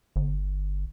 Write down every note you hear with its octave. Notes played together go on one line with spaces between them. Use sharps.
G1